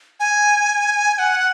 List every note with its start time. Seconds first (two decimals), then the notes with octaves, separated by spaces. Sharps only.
0.20 G#5
1.15 G#5
1.19 F#5